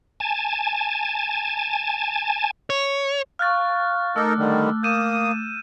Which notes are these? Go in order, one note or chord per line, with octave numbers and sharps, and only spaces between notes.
G#5 A5
C#5
F5 C#6 F6 F#6 A6
A3 D#4 A4 A#4 D6 E6
D3 D#3 G3
A#3 D#6 G6 D#7 E7